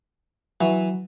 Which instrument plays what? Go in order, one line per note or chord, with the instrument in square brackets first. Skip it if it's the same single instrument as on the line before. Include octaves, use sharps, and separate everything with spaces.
[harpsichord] E3 [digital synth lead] F#3